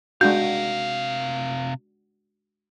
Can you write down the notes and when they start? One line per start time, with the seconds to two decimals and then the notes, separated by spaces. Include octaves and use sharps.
0.21 C3 G#3 D4 F#4 F5 G6